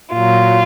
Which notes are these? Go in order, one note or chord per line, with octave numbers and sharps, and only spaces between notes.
A#2 F#3 F4